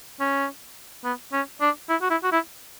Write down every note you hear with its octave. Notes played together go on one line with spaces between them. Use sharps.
C#4
B3
C#4
D4
E4
F#4
E4
F#4
E4